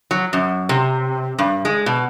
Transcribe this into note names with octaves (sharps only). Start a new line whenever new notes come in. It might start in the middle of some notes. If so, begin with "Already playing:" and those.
F#3
F#2
C3
G2
G#3
B2